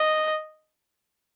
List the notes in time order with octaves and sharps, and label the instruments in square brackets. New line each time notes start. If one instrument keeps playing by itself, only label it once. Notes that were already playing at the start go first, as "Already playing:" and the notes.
Already playing: [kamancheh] D#5